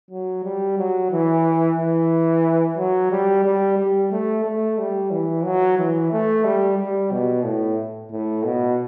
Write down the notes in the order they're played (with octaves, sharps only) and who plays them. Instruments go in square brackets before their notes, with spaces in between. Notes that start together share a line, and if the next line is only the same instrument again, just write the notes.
[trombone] F#3
G3
F#3
E3
E3
F#3
G3
G3
G3
A3
A3
G3
E3
F#3
E3
A3
G3
G3
B2
A2
A2
B2